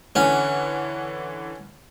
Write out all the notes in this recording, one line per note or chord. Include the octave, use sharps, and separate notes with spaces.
D3 E3 C#4 F#5